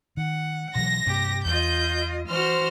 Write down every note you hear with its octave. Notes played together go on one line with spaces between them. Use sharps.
D#3 F#5
B2 E3 F#3 A#6
G2 C3 G4
E2 F4 D#5 G6
E3 F#4 C5 F6